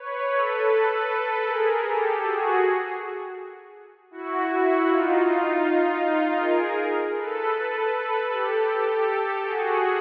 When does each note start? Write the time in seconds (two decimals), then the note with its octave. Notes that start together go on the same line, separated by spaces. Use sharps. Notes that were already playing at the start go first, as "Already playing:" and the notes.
Already playing: B4 C#5
0.30 A4 B4
1.44 G#4 A#4
1.83 G4 A4
2.21 F#4 G#4
4.11 E4 F#4
4.86 D#4 F4
6.38 G#4 A#4
7.15 A4 B4
7.52 A4 B4
7.90 A4 B4
8.29 G4 A4
9.43 F#4 G#4